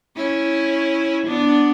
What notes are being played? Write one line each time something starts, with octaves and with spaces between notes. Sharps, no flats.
C#4 E4
B3 D4